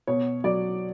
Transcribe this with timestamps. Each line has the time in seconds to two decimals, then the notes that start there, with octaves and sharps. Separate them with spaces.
0.07 B2 C#5
0.44 F#3 D5